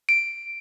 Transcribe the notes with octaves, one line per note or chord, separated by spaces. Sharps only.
D7